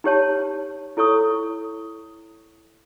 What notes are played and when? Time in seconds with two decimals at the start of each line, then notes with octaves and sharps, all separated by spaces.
0.04 D#4 G4 C#5 A5
0.97 E4 A4 C#5 C#6 D#6